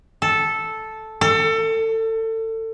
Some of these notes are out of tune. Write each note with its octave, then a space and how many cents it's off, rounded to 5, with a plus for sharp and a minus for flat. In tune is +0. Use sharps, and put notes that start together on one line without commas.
A4 -5
A4 +30